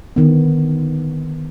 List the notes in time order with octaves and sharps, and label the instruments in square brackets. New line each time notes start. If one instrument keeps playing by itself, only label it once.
[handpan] D3 D#3 B3